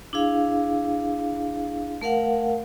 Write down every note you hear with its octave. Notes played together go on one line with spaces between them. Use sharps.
D4 E4 G#4 F5
A3 A#4 F5 F#5